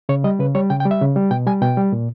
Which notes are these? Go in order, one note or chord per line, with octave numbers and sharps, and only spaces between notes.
C#3 C#5
G3 D#5
C#3 B4
G3 C#5
C#3 G5
G5
G3
E5
C#3
G3
B2 G5
G3 G#5
B2 G5
G3
A#2